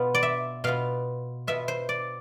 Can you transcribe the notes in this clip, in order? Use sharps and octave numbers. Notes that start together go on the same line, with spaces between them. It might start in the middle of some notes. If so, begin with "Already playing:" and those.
Already playing: B2 B3 F4
D5
E5
B2 B3 F4 F5
B2 B3 F4 E5
C5
D5